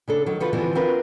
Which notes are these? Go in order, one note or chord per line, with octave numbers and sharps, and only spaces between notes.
C#3 D4 A4
D#3 F#3
D3 F3 F#4 A4 B4
D3 E3 F3 G3 B3 C4
C4 D4 F4 F#4 A#4 B4